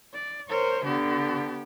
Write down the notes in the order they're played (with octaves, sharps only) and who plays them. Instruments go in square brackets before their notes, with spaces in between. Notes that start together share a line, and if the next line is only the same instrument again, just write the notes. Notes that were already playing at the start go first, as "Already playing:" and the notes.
[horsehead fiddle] D5
[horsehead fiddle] A#4 C5 [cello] C#5
[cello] D3 [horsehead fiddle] B3 G4